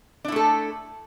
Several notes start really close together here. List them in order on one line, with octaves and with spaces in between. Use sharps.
D4 E4 A3 A4